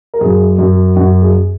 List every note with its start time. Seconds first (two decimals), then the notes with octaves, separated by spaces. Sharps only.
0.14 A#4
0.21 F#2 G#4
0.58 F#2
0.96 F#2 F#4
1.21 G#4